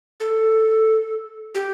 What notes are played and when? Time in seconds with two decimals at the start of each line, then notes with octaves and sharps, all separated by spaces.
0.20 A4
1.55 G4